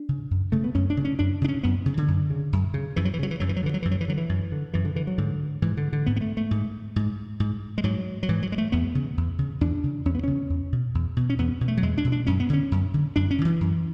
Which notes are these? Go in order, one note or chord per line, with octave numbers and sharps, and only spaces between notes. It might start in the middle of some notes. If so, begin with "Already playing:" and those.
Already playing: D4
C#3
F#2
C#3 A3
B3
F#2 C#4
D4
C#3
C#4
F#2 D4
C#3 D4
C#4
F#2 B3
C#3
D3
F#2
C#3
F#2
C#3
F#2 E3
F#3
E3
C#3 F#3
E3
F#2 F#3
E3
F#3
D3 E3
F#3
F#2 E3
F#3
E3
D3 F#3
E3
F#2
D3
F#2 E3
D3
D3 E3
F#3
G#2 D3
G#2 E3
D3
D3
G#2 B3
B3
A3
A3
G#2
G#2
G#2
G#3
G#2 F#3
F#3
G#2 E3
F#3
G#3
A3
E2 B3
C#3
E2
C#3
E2 D4
C#3
E2 C#4
B3
C#3 C#4
E2
B2
E2
B2
C#4
E2 B3
B2
A3
F#3
E2 G#3
D4
B2
D4
F#2 C#4
B3
D3 C#4
F#2
D3
F#2 D4
C#4
D3
E3
F#2